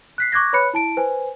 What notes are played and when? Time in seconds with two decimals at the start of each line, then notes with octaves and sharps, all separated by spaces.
0.18 F#6 B6 C7
0.32 C#6 D6 F#6 G#6 A#6
0.53 B4 C#5 B5 F#6 C#7
0.73 E4 A5 D7
0.97 B4 C5 G#5